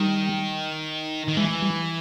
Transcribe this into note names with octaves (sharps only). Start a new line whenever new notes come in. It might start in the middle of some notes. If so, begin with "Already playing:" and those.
Already playing: D#3 G3
D#3
E3 G#3
G3